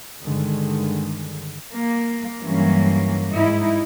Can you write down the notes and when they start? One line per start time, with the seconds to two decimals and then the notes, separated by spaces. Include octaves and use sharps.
0.22 G2 D3 D#3 G#3
1.73 A#3
2.42 G2 E3 F#3 A#3 C#4
3.29 G#2 D#4 E4